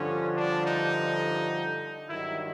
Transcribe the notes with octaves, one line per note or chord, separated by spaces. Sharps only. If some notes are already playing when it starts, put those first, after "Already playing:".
Already playing: G2 D3 F3 C#4
D4
D#4
G2 D#3 F#3 E4